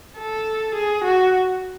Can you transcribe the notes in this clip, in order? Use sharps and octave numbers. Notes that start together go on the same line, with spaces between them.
A4
G#4
F#4